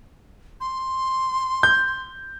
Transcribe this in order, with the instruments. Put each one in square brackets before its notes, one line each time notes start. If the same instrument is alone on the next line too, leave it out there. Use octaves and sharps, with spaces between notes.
[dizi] C6
[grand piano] G6